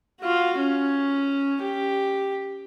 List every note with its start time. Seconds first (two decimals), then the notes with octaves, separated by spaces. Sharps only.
0.21 F4 F#4
0.58 C#4
1.62 G4